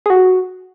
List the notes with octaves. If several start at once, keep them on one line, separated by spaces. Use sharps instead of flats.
G#4
F#4